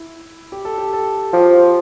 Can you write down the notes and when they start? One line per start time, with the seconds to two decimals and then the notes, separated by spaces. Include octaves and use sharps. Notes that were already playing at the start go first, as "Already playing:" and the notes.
Already playing: E4
0.52 G4
0.65 A4
0.78 G4
0.93 A4
1.33 F3 G4